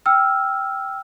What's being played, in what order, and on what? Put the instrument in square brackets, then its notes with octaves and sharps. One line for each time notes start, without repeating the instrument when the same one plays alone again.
[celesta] G5 E6 F6